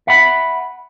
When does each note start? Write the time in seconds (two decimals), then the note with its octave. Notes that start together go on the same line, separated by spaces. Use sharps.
0.07 E5 F#5 B5